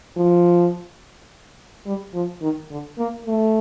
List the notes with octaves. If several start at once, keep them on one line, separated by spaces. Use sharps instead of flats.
F3
G3
F3
D#3
D3
A#3
A3